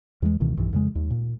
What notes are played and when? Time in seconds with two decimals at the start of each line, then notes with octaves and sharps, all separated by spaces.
0.22 E2 E3 F#3 G#3
0.40 C#2 B2 D#3 E3
0.57 B1 G2 E3
0.73 F2 C#3 G#3
0.95 D#2
1.10 A#2